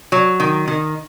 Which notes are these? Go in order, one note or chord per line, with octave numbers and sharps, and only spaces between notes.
F#3
D#3
D#3